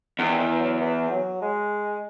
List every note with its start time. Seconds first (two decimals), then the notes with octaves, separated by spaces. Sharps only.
0.18 E2 D#3
0.39 E3
0.60 F#3
0.80 E3
1.11 F#3
1.41 G#3